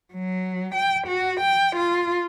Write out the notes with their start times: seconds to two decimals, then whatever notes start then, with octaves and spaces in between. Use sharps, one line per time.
0.13 F#3
0.75 G5
1.07 F#4
1.41 G5
1.77 F4